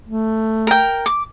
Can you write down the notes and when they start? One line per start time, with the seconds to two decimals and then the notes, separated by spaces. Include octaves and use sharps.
0.08 A3
0.67 A#4 G5
1.06 D6